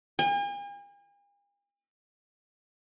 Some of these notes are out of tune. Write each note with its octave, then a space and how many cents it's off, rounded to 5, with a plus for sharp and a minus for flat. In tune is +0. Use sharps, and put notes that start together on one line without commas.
G#5 -45